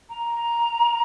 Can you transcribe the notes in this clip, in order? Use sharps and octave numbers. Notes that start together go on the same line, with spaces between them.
A#5